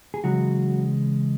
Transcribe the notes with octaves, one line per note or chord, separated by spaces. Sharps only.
G#4
C#3 E3 F#3 G#3 F#4